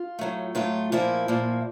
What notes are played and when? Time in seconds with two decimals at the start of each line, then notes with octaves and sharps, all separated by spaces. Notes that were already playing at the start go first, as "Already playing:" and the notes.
Already playing: F4
0.19 A2 F#3 A3
0.55 A2 F#3 A3 F4
0.92 A#2 F3 A#3 E4
1.28 A#2 F3 A#3